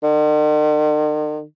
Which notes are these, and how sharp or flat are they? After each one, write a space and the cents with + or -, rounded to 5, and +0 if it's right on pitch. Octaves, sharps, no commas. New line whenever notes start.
D#3 -45